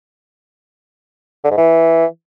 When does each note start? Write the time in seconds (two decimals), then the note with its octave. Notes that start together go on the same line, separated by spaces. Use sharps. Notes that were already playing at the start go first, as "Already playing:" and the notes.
1.44 D3
1.51 G#2
1.58 E3